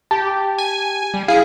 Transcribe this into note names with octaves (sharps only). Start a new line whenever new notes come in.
G4 A5
G#5
G3
E4 G#4 F5